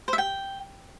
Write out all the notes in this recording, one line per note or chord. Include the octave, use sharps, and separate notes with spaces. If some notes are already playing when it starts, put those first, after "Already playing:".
C5
E5
G5